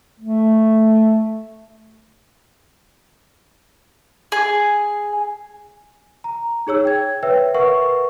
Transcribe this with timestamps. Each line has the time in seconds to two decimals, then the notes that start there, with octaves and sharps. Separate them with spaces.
0.20 A3
4.32 G#4
6.24 A#5
6.67 D#4 G#4 C#5 E6
6.85 G5 G#6
7.23 B4 C#5 E5 G5 E6
7.54 A#4 B4 E5 F#5 C#6